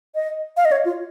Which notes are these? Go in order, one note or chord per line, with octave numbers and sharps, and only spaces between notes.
D#5
F5
D#5
C#5
F4